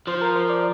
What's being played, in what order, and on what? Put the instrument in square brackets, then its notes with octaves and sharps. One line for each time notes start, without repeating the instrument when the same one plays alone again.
[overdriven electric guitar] F3 [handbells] C5 C6
[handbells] A#4 A#5
C5 C6
D5 D6